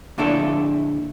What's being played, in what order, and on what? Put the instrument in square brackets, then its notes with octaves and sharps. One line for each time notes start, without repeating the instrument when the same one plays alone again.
[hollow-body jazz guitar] A#2 D3 D4 E4 A4